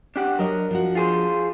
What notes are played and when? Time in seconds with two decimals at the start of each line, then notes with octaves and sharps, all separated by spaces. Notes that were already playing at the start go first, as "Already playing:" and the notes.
0.16 D4 G4 F#5
0.39 F#3 D4 A#4 D#5
0.71 F3 D4 F#4
0.95 F4 G#4 C5